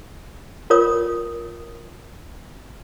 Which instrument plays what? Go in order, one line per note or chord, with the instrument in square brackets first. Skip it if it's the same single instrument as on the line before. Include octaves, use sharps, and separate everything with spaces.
[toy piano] F4 A#4 C#5 D#6